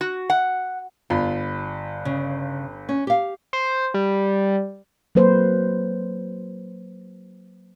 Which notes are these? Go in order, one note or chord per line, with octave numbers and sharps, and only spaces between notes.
F#4
F#5
G1 F4 B5
C#3
C#4
G4 F5
C5
G3
F#3 A#3 B4 C5